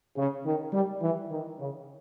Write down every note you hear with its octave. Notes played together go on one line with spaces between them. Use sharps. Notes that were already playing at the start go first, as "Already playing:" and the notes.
C#3
D#3
G3
E3
D#3
C#3